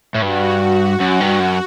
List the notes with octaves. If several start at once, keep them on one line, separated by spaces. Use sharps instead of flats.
A2
G2 F#4
F#2
G2
F#2